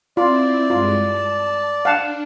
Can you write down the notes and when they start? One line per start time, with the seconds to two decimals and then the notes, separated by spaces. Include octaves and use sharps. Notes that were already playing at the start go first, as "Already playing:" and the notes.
0.17 C4 E4 F4 D5
0.70 G2 G#3 F4
1.03 A5
1.85 D4 F5 F#5 A5